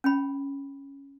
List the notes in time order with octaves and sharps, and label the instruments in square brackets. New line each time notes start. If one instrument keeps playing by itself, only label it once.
[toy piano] C#4 G5 B5